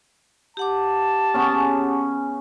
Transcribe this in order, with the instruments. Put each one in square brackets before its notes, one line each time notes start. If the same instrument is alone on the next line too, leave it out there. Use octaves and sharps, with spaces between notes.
[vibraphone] G4 F#5 D6 [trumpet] A5
[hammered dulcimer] C#3 B3 C#4